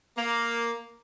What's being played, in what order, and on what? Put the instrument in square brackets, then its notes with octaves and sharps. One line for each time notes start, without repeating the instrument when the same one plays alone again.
[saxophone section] A#3